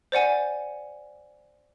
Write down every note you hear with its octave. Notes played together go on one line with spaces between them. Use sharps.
C5 D5 F#5 G#5